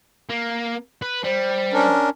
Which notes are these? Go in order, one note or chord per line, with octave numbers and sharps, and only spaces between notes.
A#3
B4
G3 C5
C#4 D4 A#4